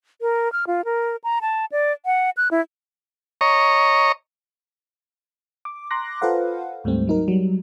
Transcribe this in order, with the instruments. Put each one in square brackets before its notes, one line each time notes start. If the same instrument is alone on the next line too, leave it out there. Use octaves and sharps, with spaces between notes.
[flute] A#4
F6
F4
A#4
A#5
A5
D5
F#5
F#6
E4
[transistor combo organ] C#5 D#5 A#5 C#6
[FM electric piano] D6
A#5 C6 D6 F#6 A#6
F4 A4 B4 C5 F5 F#5
D2 G#2 G3 A3 C4
F#3 D#4 A#4
F#3 G3